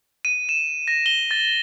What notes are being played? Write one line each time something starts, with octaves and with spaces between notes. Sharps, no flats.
D#7
E7
A#6
G7
A6